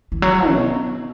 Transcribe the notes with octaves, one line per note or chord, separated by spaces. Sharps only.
E3
F#3
B2